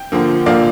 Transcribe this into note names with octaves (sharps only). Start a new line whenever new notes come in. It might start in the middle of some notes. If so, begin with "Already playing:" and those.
Already playing: G5
D3 F3 A#3
D3 F3 A#3 D5 F5